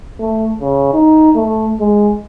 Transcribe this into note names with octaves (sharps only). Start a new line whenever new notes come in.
A3
C#3
D#4
A3
G#3